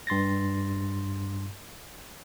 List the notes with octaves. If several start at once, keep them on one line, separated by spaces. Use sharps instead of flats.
G2 C6 A6 A#6